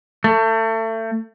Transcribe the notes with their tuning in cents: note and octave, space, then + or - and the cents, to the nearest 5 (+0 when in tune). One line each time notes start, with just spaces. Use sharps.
A3 +30